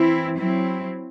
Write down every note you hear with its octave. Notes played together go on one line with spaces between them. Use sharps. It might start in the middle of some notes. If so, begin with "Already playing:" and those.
Already playing: E3 C4 E4
F#3 C4 E4